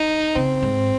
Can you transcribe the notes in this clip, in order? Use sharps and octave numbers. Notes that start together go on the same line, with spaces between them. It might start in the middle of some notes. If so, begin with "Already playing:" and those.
Already playing: D#4
C#3 C4
G#2